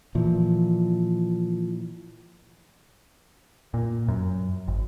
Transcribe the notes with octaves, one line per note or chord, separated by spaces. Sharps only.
A#2 E3 F3
A#2
F#2
G#1